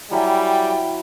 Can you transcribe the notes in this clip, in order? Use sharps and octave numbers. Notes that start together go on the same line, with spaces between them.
F#3 G3 E4 G5 G#5